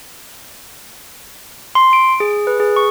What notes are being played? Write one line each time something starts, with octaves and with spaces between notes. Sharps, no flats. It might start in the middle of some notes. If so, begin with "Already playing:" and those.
C6
D7
G#4
B4
G#4
C#6